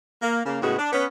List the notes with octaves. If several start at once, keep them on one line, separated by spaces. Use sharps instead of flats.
A#3
C#3 A#3
A2 C#3 G#3 B3 F#4 G#4
D4
B3 C#4